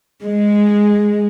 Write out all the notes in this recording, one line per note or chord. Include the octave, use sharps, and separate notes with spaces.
G#3